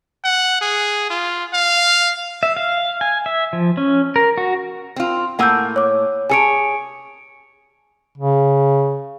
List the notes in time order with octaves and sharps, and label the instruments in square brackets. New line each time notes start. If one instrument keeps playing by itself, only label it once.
[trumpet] F#5
G#4
F4
F5
[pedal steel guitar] E5
F5
G#5
E5
F3
C#4
A#4
F#4
[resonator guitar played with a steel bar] C4 F4
[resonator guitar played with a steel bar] A2 A#3 G#5 [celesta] F#5 E6 G6
[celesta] C#5 D6
[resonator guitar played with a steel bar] G#4 A4 C#5 [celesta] G#5 C#7 D7
[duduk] C#3